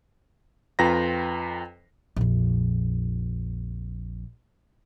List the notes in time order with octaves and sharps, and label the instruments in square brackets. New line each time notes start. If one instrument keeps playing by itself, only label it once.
[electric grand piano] F2 F4 B4 G5 A#5 A#6
[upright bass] A#1 F2